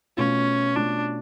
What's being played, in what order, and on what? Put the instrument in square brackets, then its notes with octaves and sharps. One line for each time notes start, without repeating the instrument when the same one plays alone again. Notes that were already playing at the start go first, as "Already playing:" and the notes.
[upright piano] B2 A3 F4 [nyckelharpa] C#4
[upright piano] B2 A3 F4 [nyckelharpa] D4